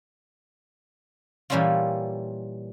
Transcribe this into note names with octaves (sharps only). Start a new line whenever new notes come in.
A#2 E3 G3 C#4 E4 F4